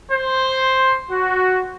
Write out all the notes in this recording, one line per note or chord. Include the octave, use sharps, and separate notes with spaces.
C5
F#4